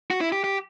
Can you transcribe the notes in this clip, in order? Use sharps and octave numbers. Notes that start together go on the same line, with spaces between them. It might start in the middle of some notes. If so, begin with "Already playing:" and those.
F#4
E4
G4
G4